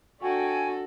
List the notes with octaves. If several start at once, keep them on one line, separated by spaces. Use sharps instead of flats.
D4 F#4 A4 G5 G#5 C#6